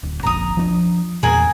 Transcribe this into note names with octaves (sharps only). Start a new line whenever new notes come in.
D1
F1 A#1 F2 A#5 D#6
F3 C4 D4
E2 A#2 G#4 A#4 G#5